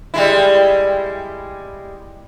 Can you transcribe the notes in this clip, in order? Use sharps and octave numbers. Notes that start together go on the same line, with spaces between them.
G3 G#3 E4